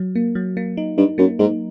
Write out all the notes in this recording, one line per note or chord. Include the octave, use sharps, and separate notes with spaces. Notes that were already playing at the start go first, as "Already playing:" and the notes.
Already playing: F#3
A#3
F#3
A#3
D#4
G2 D#4
F#2 A#3
G#2 D#4